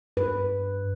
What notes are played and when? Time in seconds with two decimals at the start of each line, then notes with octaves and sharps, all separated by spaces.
0.17 G2 B4